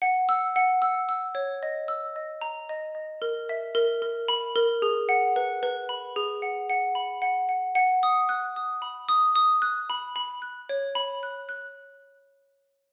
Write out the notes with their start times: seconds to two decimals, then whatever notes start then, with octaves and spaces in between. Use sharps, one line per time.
0.02 F#5
0.29 E6
0.56 F#5
0.82 E6
1.09 E6
1.35 C#5
1.63 D#5
1.88 E6
2.16 D#5
2.41 A#5
2.69 D#5
2.95 D#5
3.22 A#4
3.49 E5
3.75 A#4
4.02 A#4
4.28 B5
4.56 A#4
4.82 G#4
5.09 F#5
5.36 B4
5.63 B4
5.89 B5
6.16 G#4
6.42 F#5
6.70 F#5
6.95 B5
7.22 F#5
7.49 F#5
7.75 F#5
8.03 D#6
8.29 F#6
8.56 D#6
8.82 B5
9.09 D#6
9.36 D#6
9.62 F#6
9.90 B5
10.16 B5
10.42 F#6
10.69 C#5
10.95 B5
11.23 F#6
11.49 F#6